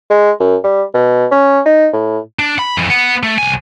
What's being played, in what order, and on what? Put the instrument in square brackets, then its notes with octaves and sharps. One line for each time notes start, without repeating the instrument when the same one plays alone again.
[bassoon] G#3
F#2
G3
B2
C#4
D#4
A2
[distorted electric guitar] D4
B5
F2 E3
B3 F#5
A3
C2 G#5